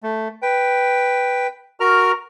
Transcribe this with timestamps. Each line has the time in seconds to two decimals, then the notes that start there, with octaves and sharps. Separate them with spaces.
0.03 A3
0.42 B4 G5
1.80 F#4 A#4 A#5 F6